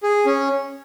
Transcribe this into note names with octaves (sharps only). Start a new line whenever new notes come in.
G#4
C#4